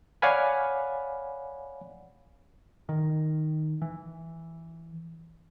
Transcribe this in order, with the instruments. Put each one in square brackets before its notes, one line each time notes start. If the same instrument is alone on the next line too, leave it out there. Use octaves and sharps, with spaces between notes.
[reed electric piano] C#5 D5 F5 F#5 G#5 B5
[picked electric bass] D#3
E3